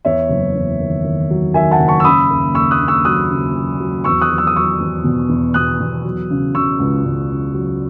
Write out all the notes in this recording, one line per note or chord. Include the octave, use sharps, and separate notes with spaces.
E2 C#5 E5
F#1
E2
D#3
D#3
F#3
D#3 E5 G#5
F#5 A5
F#1
A5 C#6
E6
C#3 B5 D#6
D#2
D#2 C#6 E6
D#6 F#6
C#3
C#6 E6
F#3 D#6 F#6
C#3
F#3
F#3
E2 C#6 E6
D#6 F#6
F#3
E6
D#6
F#3 C#6 E6
E2
B2
E2
B2 D#6 F#6
E2
F#3
C#3
C#3 C#6 E6
C#2
C#2
C#3
F#3